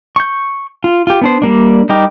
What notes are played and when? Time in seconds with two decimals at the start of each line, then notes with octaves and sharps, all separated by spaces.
0.16 C#6 G6
0.84 F4
1.07 F4 G4
1.21 B3 D4 C5
1.42 G3 A#3 D4
1.89 G3 D#4 G4 A#4